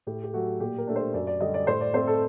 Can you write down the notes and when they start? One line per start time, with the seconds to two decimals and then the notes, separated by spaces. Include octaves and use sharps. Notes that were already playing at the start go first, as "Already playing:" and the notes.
0.07 A2 G4
0.24 G4
0.34 F#3 A3 F#4
0.60 A#2 G4
0.78 A#4
0.87 A3 D4
0.96 C5
1.14 F#2 D5
1.27 D5
1.40 D3 G3 D#5
1.54 D5
1.67 A2 C5
1.81 D5
1.94 A3 C4 C5
2.07 A4